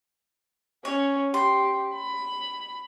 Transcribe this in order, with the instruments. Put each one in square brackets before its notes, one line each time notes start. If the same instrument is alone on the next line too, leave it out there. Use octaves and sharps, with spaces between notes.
[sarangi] C#4 [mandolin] C#5
[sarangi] G4 [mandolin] C6
[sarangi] B5